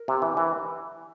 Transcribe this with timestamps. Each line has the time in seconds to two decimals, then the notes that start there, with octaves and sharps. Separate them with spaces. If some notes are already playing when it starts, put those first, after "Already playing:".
Already playing: A#4
0.08 C3
0.22 E3
0.37 E3